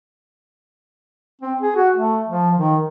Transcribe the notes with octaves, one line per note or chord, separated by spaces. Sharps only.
C4
G#4
F#4
A3
F3
D#3